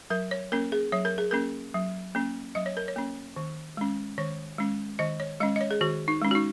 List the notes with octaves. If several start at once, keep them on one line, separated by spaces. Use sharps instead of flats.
F#3 A#4
C#5
A#3 C#4 A#4
G#4
F#3 C#5
A#4
G#4
A#3 C#4 A#4
F#3
A#3 C#4
F#3 D#5
C#5
A#4
C#5
A#3 C#4
D#3
G#3 C#4
D#3 C#5
G#3 C#4
D#3 D#5
C#5
G#3 C#4 D#5
D#5
C#5
G#4
D#3 F#4
D#4
G#3 C#4
F#4
D#4